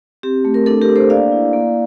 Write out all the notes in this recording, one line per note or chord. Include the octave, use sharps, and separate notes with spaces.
C4 G4
A3
A#4
D4 A4
G4 A#4
D4
A4 C5
A#3 D5 F5
E4
A#3